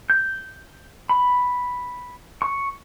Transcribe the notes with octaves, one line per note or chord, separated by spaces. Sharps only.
G6
B5
C#6